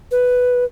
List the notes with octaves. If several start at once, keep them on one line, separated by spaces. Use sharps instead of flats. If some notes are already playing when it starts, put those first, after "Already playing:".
B4